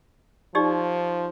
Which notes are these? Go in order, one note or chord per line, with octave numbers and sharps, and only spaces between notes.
F3 D#4 G4 D5